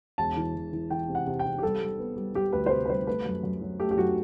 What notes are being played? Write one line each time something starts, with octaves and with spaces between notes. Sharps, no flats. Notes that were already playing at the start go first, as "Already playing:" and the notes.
E1 A5
E3
E1
E3
E3 G5
C3
F#5
C3
G5
C3
G4
G3 A4
G3
B3
G3
G3 G4
D2 B4
C5
C3 B4
B4
G3 C5
A3 B4
F#2
F#2
F#3
A3 G4
G4
F#2 F#4